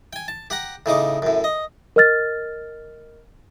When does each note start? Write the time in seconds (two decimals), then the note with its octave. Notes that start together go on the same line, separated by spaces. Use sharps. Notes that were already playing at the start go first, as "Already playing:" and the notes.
0.13 G5 G#5
0.28 A5
0.50 G4 F#5 A#5
0.86 A2 C#3 D#4 D6
1.22 F#2 A2
1.44 D#5
1.96 A#4 D#5 F6 A6